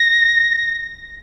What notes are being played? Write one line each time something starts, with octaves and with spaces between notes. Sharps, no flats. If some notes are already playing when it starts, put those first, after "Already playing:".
Already playing: A#6